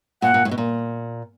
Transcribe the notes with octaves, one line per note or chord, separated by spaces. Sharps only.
A#2 F#5
A#2
A2
B2
A#2